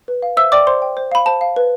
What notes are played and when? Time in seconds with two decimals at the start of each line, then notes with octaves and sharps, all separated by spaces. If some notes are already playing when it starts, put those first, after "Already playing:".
0.08 B4
0.22 F5
0.37 C5 E5 E6
0.52 D5 G5 D6
0.67 C5 C6
0.82 G5
0.97 C5
1.12 F5 B5
1.26 C5 A5
1.41 F5
1.56 B4